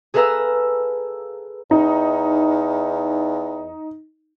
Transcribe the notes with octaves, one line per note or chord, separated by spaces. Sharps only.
G#4 A4 B4 F5 A#5 E6
E2 D#4